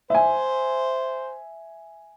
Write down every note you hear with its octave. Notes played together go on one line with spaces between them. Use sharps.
C5 E5 G#5